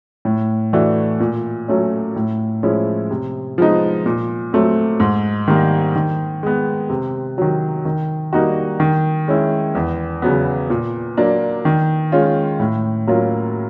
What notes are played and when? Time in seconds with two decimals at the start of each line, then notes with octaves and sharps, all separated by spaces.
0.25 A2
0.73 E3 A3 D4 F#4
1.20 A#2
1.68 F#3 A3 C#4
2.16 A2
2.63 F3 G#3 C#4 E4
3.11 C3
3.58 F3 G#3 B3 D#4
4.06 A#2
4.53 F#3 A3 C4
5.00 G#2
5.48 D#3 G3 A#3
5.96 D#3
6.43 G#3 B3
6.90 C3
7.38 D#3 F#3
7.85 D#3
8.33 G3 A#3 D#4 F#4
8.80 D#3
9.28 G#3 C#4 E4
9.75 E2
10.22 C#3 F#3 B3
10.70 A#2
11.17 F#3 A#3 D4
11.65 D#3
12.12 G#3 C#4 F4
12.60 A2
13.07 F#3 A#3 C#4 F4